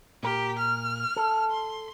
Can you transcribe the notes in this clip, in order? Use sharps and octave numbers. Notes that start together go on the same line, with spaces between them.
A#2 G4 A#4
F6
A4
C6